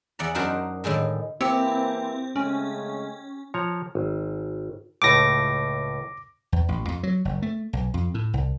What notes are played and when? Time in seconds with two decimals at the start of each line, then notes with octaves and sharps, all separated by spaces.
0.19 E2 D5 F#5 A#5
0.35 F#2 D4 D#4 F#4 A#4 C5
0.84 A2 D3 D#3 G#3
1.41 E3 A#3 C4 E4 G4
2.36 C#3 G#3 A3 C#4
3.54 F3 C#5 A#5
3.95 G#1
5.02 C#2 A2 A3 D6 A#6
6.52 E2
6.69 A1
6.89 F2
7.03 F#3
7.25 F#1
7.42 A3
7.73 B1
7.94 F2
8.14 A2
8.34 C2